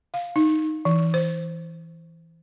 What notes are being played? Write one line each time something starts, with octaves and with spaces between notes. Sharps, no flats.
F5
D#4
E3
C5